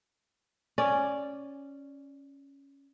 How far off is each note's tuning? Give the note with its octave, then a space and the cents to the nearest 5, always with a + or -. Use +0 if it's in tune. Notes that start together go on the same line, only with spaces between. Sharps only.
C#4 +0 D5 -5